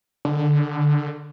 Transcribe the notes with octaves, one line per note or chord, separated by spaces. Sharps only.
D3